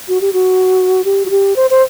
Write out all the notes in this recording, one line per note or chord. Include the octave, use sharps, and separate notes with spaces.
F#4
G4
F#4
G4
F#4
G4
C5
C5